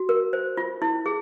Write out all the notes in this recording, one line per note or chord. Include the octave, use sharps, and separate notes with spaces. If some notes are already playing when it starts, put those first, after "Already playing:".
Already playing: F#4
A#4
C5
F4
E4
G#4